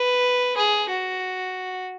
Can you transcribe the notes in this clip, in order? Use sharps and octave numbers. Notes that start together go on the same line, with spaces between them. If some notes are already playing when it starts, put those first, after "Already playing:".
Already playing: B4
G#4
F#4